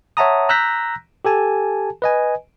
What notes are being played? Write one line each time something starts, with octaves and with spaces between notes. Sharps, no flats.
C#5 E5 F#5 A5 A#5 D#6
A#5 E6 F#6 G6 A#6 B6
G4 A4 G#5 A5
B4 D#5 G#5